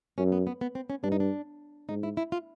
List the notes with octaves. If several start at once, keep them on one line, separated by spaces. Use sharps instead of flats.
F#2 C#4
B3
B3
B3
C4
C#4
G2 D4
D#4
D4
G#2 D#4
E4
E4
F4